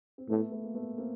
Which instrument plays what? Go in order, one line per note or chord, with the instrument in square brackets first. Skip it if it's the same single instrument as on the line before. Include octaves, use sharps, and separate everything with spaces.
[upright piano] C4
[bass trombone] A2 [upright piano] A3 B3
[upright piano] A3 B3
A#3
A3 B3
A#3 C4